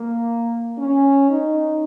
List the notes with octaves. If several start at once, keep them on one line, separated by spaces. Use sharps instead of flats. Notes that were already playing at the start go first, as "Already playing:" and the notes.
Already playing: A#3
C#4
D#4